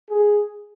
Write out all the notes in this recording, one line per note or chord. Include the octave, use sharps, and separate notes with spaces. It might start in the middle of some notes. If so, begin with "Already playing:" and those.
G#4